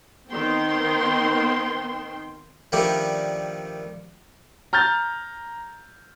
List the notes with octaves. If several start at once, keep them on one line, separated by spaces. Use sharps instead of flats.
D#3 B3 C4 G5 C6
D#3 F3 G3 A3 D4 D6
A#5 F6 G6 A6